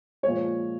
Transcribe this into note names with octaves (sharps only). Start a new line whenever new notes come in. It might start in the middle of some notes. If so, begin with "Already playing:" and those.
A#2 F3 G#3 C#5